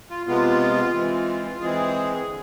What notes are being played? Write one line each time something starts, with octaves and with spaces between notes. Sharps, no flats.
F4
C3 G#3 B3 F4
E3 G#3 C4
E3 G#3 C4 G#4
D3